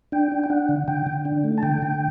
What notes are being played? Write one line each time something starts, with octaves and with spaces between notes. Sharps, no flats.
D4 G5
D4
G5
D4 F#5
D3
D3 G5
D3
D4
A3
A5
D3 G5
D3